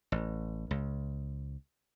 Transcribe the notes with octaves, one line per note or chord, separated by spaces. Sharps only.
A1
C#2